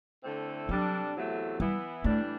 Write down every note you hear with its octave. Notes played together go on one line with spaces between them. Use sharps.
D3 A3 C4 E4 A4
C3 F#3 G3 D4 A4
E2 C3 F#3 A3
E3 G3 B3 E4
A2 E3 G3 A3 D4